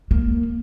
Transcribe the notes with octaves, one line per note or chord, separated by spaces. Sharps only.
A#3